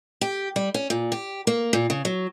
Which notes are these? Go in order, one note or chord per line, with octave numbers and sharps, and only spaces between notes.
G4
G3
C#4
A#2
G4
A#3
A#2
C#3
F#3